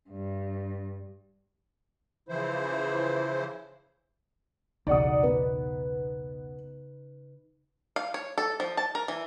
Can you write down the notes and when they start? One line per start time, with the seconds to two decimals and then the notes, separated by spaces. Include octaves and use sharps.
0.10 G2
2.29 C#3 E3 F3 E4 C5
4.87 B1 E2 C#3 D#4 D5 F#5 D#6
5.23 B3 B4
7.96 F5
8.14 C#5
8.38 A4
8.60 F3
8.77 A5
8.95 A#4
9.08 E3